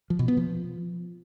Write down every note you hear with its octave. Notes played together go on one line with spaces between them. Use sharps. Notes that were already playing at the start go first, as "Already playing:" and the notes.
F3
B2
B3
F3